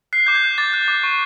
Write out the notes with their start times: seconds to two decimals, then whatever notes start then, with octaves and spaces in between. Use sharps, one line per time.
0.13 F#6 C7
0.27 D6 G6
0.35 G#6
0.43 F#6
0.58 D6 A6
0.73 F#6
0.88 D6
1.04 C#6